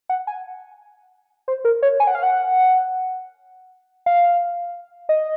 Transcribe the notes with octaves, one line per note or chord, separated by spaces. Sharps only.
F#5
G#5
C5
A#4
C#5
G#5
F#5
F5
F#5
F5
D#5